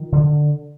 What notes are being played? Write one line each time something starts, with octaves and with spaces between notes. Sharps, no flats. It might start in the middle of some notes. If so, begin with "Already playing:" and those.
Already playing: D#3 F3
D3